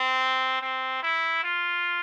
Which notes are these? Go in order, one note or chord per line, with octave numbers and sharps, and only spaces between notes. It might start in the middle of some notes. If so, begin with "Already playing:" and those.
Already playing: C4
C4
E4
F4